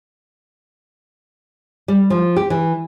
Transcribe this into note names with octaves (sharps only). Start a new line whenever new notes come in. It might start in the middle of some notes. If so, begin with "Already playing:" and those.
G3
F3
G4
E3